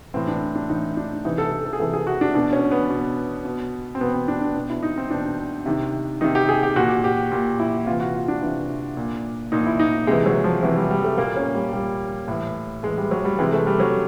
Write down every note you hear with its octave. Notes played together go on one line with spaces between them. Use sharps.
A2 E3 C4
D4
D4
A2 E3 D#4
D4
C3 E3 D#4
A4
A4
A4
G#4
C3 E3 A4
G#4
F#4
D4
B2 D4
C#4
B3
B2
B2
C4
B2 B3
C4
D4
D4
B2
E4
D#4
C4
B2 D4
C3 D#3
C3 D#3 D#4
G4
G#4
G4
A#2 F#4
G4
A#2
E4
C3 E3 F4
F#4
F4
D4
C3 E3
A#2
A#2 D#4
E4
D#4
C3 E3 G#3
F#3
F3
C3 E3 F#3
G3
G3
A3
A#2 A#3
C#4
G3
A#2 G3
A2 E3
A2 E3 G#3
G3
F#3
G3
C3 E3 G#3
A3
G3
F#3